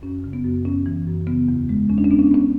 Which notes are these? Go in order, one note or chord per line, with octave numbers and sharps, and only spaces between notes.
F#2 C#4
C#3
B3
F#2
F#2 C#4
E3
F#2
C#3 B3
E2
G#3
E2 C#4
D4
C#4
B3 D4
C#4
D4
B3 C#4